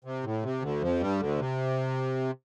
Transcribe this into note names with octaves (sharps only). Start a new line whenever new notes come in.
C3
A2
C3
D2 D3
F2 F3
G2 G3
D2 D3
C3